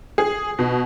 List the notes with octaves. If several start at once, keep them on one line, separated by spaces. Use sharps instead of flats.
G#4
B2